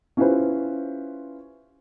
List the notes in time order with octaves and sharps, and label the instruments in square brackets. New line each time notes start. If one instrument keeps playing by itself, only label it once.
[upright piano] C#4 E4 F4 G4 B4 C5